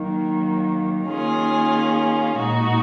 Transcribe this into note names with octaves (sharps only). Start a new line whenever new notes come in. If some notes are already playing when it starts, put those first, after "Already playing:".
Already playing: D#3 F#3 A#3
D#3 A#3 C#4 F4 G#4
A#2 G#3 D#4 F#4